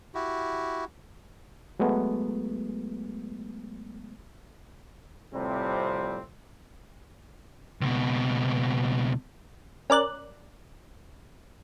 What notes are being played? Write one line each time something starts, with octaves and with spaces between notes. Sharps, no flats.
E4 F#4 G4
F#3 G#3 A3 B3
A2 C3 F3 G3 C4
C#2 B2
C#4 A#4 D5 F#6